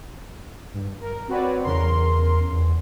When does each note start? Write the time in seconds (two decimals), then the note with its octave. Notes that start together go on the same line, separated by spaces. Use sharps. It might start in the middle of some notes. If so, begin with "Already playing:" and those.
0.74 G2
1.01 A#4
1.28 C4 F#4 B4 C#5 D5
1.64 E2 C#3 A#4 C6
2.52 E2